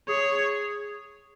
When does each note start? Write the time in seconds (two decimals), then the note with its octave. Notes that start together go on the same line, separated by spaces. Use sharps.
0.08 G#4 C#5